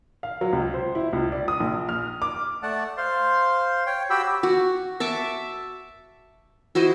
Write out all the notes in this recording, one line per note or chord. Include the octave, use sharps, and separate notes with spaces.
F5
F#3
C#2
C5
E4
C#2
D5
D#6
A#1
F6
D6
A3 D5 F#5 A5
C5 F5 C6
C#5 G5
F#4 G4 G5 B5 E6
F#4
E5 A5 C#6 D6
E4 F#4 C5 D#5